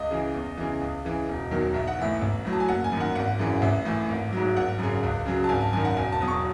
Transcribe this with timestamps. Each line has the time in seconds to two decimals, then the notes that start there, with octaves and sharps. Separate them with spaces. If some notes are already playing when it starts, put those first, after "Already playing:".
Already playing: C#2 D#5
0.11 C#3 E3
0.34 E2
0.57 C#3 E3
0.81 C#2
1.05 C#3 E3
1.29 E1
1.51 E2 D#3 F#3
1.74 B1 E5
1.87 F#5
1.99 A2 E3 E5
2.22 A1
2.45 A2 F#3
2.53 A5
2.60 G#5
2.68 F#1 F#5
2.84 G#5
2.92 F#2
2.97 D#3 F#5
3.15 G#1 F#5
3.39 F#2 C#3 E3
3.62 A1 E5
3.85 A2 E3
4.09 G#1
4.32 G#2 F#3
4.56 G#1 F#5
4.79 F#2 C#3
5.03 C#2
5.26 C#3 F#3
5.44 A5
5.49 G#1 G#5
5.61 A5
5.73 F#2 D#3 G#5
5.85 F#5
5.97 E1 G#5
6.12 A5
6.20 E2 B2 F#3 D#6
6.28 C#6